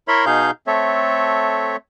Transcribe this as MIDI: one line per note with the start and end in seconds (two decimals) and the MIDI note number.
0.08 0.25 64
0.08 0.25 70
0.08 0.25 73
0.08 0.25 76
0.08 0.25 83
0.08 0.25 84
0.26 0.51 47
0.26 0.51 63
0.26 0.51 68
0.26 0.51 77
0.26 0.51 91
0.67 1.76 57
0.67 1.76 60
0.67 1.76 69
0.67 1.76 73
0.67 1.76 76